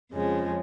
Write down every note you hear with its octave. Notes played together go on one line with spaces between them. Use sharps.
F2 C#3 F3 G#3